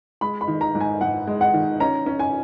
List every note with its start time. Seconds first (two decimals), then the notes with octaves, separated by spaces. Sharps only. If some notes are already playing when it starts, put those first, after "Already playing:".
0.21 G#3 B5
0.41 B5
0.48 D#3
0.61 A#5
0.75 G#2
0.80 G#5
1.01 G#2 F#5
1.27 G#3
1.41 F#5
1.54 D#3
1.80 C#4 A#5
2.06 C#4
2.19 G#5